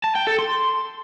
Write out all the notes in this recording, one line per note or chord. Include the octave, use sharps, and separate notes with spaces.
A5
G5
A4
C6